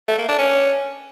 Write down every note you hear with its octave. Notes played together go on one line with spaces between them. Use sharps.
A3
A#3
D4
C#4